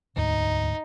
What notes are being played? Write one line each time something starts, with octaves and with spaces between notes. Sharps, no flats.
E1 D2 G#2 D#4